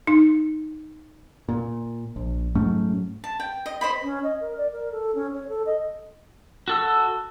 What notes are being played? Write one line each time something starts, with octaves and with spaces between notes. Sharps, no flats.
D#4
A#2
A#1
G#2 F#3 A3 C#4
A5
G5
D#5
C5 D#5 B5
C#4
D#5
A#4
D5
A#4
A4
C#4
C#5
A4
D#5
F#4 A4 E6